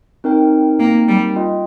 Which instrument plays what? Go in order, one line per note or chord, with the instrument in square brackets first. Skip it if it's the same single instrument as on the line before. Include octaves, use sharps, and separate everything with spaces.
[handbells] C4 D#4 A#4 G5
[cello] A#3
G3
[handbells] F4 D#5 G5